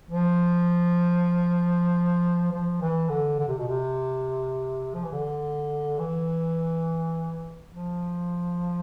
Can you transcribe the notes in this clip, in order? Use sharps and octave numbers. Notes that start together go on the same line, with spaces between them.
F3
F3
E3
D3
D3
C3
B2
C3
F3
E3
D3
E3
F3